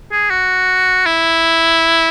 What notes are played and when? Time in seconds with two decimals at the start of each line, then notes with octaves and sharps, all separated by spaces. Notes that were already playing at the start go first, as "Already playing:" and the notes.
0.12 G#4
0.30 F#4
1.06 E4